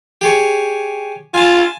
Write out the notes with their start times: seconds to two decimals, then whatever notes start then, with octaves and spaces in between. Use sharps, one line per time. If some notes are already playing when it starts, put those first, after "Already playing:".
0.21 G4 G#4 C#5
1.34 F4 G#5 A5